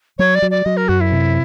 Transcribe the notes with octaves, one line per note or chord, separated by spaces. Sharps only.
F#3 C#5
D5
F#3
D5
F#3 D#5
A#4
F#2 F#4
E4
C3